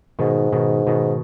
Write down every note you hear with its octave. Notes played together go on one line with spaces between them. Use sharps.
G#2 B2 D#3
B2 D#3
B2 D#3